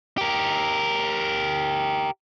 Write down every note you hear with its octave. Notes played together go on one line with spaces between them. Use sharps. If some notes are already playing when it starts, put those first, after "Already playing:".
G4 A#4